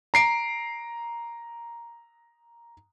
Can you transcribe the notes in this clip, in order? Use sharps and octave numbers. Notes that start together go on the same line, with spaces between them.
A#5 C7 D7